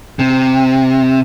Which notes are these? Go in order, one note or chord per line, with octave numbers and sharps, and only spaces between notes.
C3